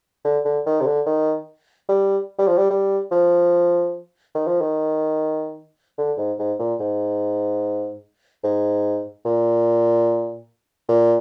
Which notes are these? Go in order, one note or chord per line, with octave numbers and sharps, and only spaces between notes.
D3
D3
D#3
C3
D3
D#3
G3
G3
F3
G3
G3
F3
D#3
F3
D#3
D3
G#2
G#2
A#2
G#2
G#2
A#2
A#2